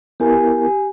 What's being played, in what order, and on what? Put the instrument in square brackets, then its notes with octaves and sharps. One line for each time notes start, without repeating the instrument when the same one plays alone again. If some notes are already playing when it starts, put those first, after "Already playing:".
[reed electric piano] B3 E4 A#4 [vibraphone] G4 G#5